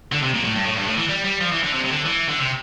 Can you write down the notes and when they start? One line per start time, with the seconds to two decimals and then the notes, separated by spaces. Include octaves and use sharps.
0.12 D3
0.22 C3
0.34 A#2
0.45 A2
0.56 G2
0.65 A2
0.77 G2
0.87 A2
0.98 E3
1.09 G3
1.25 G3
1.41 F3
1.52 E3
1.64 D3
1.73 C3
1.84 C3
1.90 D3
2.06 E3
2.29 D3
2.39 C3